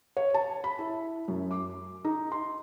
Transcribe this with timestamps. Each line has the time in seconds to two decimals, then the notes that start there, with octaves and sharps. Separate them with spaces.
0.17 C#5
0.34 A5
0.64 B5
0.79 E4
1.28 F#2
1.51 D6
2.05 D#4
2.32 C6